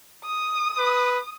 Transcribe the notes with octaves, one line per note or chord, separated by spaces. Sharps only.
D#6
B4